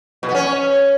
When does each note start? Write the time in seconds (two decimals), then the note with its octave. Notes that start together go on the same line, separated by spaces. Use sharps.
0.23 B2
0.29 B3
0.34 C#4